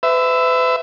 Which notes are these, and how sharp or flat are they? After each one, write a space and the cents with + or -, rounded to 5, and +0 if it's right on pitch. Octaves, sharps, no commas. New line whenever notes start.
B4 +40 E5 +0